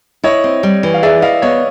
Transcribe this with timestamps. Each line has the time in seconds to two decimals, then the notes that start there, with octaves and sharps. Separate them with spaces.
0.24 E4 C#5 D#5
0.44 C4
0.63 G3
0.83 E3
0.94 F5
1.03 G#4 D5 E5
1.22 E4 D#5 F5
1.42 B3 C#5 D#5